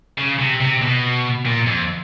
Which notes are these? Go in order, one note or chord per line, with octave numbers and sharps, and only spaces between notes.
C#3
C3
C3
B2
A#2
F2